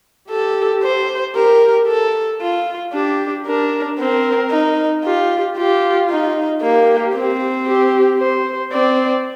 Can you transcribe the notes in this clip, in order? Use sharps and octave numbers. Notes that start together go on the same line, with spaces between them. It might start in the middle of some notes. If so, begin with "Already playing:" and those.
G4 A4
C5
G4 A#4
A4
F4
D4 G4
D4 A#4
C4 A#4
D#4
F4 G4
F4 G4
D#4
A#3 G4
C4
G4
C5
C4 D5